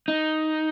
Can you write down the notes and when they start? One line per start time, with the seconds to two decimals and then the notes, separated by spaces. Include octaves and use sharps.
0.08 D#4